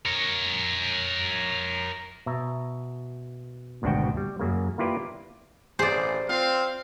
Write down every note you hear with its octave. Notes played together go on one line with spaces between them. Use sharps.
A#4 C#5
B2 E5 A#5
G#1 D2 B2 D4 F#4 G5
G3
F#2 C#3 A#3
A#3 E4 F4 G4 B4 D5
A1 G#4 C5 D5
C4 F4 F5